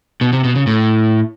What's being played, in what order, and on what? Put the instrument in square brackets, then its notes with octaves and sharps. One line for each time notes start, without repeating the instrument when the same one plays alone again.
[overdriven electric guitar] B2
C3
B2
C#3
A2